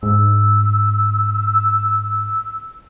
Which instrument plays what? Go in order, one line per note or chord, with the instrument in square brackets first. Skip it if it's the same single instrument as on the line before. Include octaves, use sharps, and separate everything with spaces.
[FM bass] G#2 [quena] E6